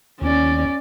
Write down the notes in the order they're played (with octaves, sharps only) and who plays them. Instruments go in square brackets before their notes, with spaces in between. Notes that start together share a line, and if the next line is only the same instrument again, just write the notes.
[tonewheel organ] D#2 [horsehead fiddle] C#4 D5